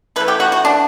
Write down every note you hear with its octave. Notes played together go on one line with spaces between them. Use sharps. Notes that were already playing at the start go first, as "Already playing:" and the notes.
E3 A3 B4
G4
F#4
F#4
D4